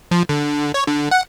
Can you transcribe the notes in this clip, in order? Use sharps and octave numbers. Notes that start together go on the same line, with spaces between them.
F3
D3
C#5
D3
F#5